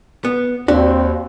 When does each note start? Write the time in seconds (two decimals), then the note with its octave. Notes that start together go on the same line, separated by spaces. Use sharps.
0.25 B3
0.68 D#2 C4 D4 F#4 G4